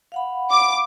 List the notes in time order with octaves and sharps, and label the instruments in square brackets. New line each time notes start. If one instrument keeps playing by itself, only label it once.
[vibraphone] F5 F#5 B5
[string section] D6